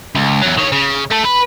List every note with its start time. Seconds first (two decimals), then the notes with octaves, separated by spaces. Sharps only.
0.15 C#2
0.42 E2 F#3
0.58 D#3 C#5
0.72 C#3
1.10 A3 A4
1.24 B4